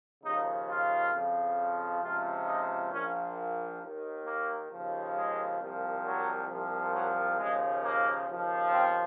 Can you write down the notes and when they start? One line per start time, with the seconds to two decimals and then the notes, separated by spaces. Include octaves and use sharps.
0.23 D#2 C#3 F3 D#4
0.68 F4
1.12 F2 C#3 F3
2.01 C#2 C3 F3 F4
2.46 D#4
2.91 A#1 A#2 F3 C#4
3.81 D#2 D#3
4.25 A#3
4.70 D#2 C#3 F3
5.14 G#3
5.60 C2 A#2 F3
6.04 F#3
6.49 C2 A#2 F3
6.94 F#3
7.38 D#2 C#3 F3 G#3
7.83 A#3
8.27 D#2 C#3 F3
8.72 C4